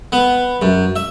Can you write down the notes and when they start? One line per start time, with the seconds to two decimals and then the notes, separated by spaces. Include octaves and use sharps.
0.12 B3
0.62 F#2
0.96 E5